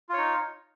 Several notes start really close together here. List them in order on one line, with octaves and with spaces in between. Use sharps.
F4 C#5 D#4